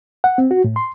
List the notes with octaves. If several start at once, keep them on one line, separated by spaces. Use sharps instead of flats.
F#5
C4
F#4
A2
C6